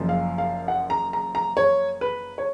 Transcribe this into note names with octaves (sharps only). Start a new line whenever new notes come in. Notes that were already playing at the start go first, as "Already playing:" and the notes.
Already playing: F#1 F#2 F3
F5
F5
F#5
A#5
A#5
A#5
C#5
B4
C#5